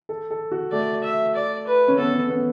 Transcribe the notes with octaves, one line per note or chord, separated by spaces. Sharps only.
A4
A4
F#4
A3 D5
E5
D5
B4
C#4
B3 A4
C#4
B3